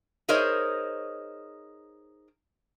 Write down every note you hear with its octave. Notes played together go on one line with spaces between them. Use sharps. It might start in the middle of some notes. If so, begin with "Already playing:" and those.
D#4 G#4 A#4 C5 C#5 D#5